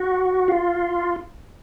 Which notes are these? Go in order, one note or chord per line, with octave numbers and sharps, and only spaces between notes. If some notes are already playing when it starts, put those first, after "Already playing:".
Already playing: F#4
F4